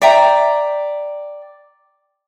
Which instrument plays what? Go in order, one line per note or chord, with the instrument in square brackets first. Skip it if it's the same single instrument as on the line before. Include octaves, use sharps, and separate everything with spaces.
[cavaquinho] D5 E5 G5 A#5